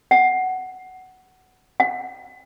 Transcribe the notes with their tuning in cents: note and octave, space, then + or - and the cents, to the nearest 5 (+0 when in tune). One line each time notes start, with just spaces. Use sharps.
F#5 +10
F#5 -20